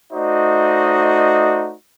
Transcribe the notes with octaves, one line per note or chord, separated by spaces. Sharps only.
A3 D#4 F#4 C5 D5 D#5